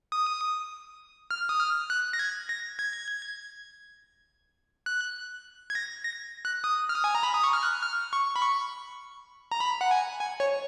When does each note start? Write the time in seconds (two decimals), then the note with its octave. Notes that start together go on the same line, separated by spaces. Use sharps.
0.12 D#6
1.31 F6
1.49 D#6
1.60 F6
1.90 F#6
2.13 A#6
2.19 G#6
2.49 A#6
2.79 G#6
4.86 F#6
5.70 G#6
5.75 A#6
6.05 A#6
6.45 F#6
6.64 D#6
6.89 F6
6.94 D#6
7.04 G#5
7.15 A#5
7.23 B5
7.34 D#6
7.44 C#6
7.53 F6
7.63 F#6
7.83 F6
8.13 C#6
8.36 B5
8.42 C#6
9.52 A#5
9.60 B5
9.81 F#5
9.91 G#5
10.20 G#5
10.40 C#5